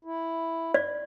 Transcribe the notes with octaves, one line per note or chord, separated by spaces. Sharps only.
E4
D5